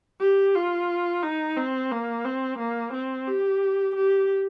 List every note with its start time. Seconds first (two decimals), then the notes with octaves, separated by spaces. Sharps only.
0.19 G4
0.55 F4
1.23 D#4
1.57 C4
1.91 A#3
2.25 C4
2.59 A#3
2.93 C4
3.27 G4
3.96 G4